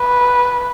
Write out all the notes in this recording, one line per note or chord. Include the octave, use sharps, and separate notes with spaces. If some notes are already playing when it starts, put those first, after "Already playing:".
Already playing: B4